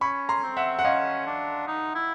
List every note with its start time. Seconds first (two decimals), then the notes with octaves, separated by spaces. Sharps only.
0.01 C#4 B5 C#6
0.29 A#5 C6
0.43 C4
0.57 E5 F#5
0.79 F#5
0.84 C#4 D#5 F5
1.27 D4
1.67 D#4
1.95 E4